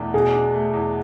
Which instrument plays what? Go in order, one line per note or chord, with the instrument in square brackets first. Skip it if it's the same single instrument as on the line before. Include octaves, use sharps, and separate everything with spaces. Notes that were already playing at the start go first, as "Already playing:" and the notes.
Already playing: [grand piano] E2 B2 A3 D4
[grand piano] B2 [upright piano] G#4
[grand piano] D4
A3
E2